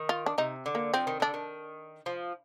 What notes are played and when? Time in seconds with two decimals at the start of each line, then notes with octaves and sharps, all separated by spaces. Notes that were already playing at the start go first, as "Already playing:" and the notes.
Already playing: D#3
0.09 F4
0.26 D4
0.38 C3 D#4
0.66 D3
0.75 A#3
0.94 F3 C4
1.07 D#3
1.20 D3 D4
1.34 D#3
2.06 F3